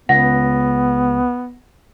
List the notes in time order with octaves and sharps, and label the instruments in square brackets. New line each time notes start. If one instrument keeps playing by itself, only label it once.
[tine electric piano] C#2 [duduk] B3 [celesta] F#5 A#6